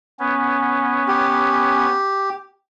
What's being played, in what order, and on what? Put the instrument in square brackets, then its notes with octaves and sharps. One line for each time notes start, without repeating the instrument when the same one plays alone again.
[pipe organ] B3 C#4
[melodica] G4